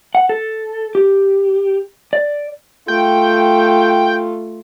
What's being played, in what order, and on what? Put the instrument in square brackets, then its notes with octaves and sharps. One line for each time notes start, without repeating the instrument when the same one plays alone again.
[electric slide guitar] F#5
A4
G4
D5
[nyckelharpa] A3 F4 [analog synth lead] G5